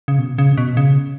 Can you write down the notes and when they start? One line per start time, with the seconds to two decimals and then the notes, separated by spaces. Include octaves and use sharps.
0.08 C#3
0.19 B2
0.38 C#3
0.57 B2
0.77 C#3